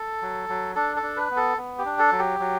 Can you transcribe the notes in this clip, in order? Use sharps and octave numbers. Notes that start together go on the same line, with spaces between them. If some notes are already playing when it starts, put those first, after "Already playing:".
Already playing: A4
F#3
F#3
D4 A4
A4
D4
B4
B3
A4
B3
G4
D4
A4
F#3
G4
F#3